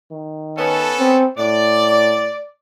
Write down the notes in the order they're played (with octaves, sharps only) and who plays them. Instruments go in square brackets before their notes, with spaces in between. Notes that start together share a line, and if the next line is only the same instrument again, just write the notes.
[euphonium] D#3
[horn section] B3 C#4 A4
[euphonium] C4
[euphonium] A2 [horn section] D5